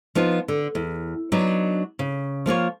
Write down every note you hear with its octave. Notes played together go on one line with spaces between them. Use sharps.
F3 B3 D#4 F4
D3
E2
F#3 B3 D4 D#4
C#3
F3 A#3 F4 C#5